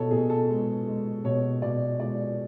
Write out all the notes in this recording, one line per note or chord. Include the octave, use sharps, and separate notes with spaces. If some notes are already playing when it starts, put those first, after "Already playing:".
Already playing: B2 A4 C#5
B2 G#4
A4
G#3
G#3
B2 C#5
B2 D5
G#3 D5